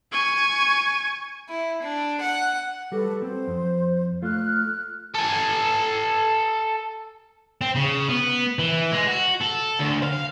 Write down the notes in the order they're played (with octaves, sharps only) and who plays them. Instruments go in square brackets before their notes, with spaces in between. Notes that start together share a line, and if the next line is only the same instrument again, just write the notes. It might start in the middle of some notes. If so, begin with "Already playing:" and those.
[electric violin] G#5 C#6
[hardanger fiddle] E4
D4
F#5
[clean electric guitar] G3 F#4 [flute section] A4 B4
[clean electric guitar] C4 [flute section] C5
[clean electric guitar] F2
[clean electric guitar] A3 F4 [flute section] F6 F#6
[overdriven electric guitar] A4 G#5
[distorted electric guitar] C4
C#3
B3
E3
G#3
F#4
A4
D2
F5